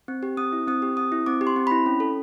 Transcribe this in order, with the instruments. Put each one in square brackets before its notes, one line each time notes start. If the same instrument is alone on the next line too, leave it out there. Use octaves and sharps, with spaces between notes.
[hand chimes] C4
G4
C4 D#6
E4
C4 D#6
G4
C4 D#6
E4
C4 D6
G4
C6
C4
E4 B5
C#4
A4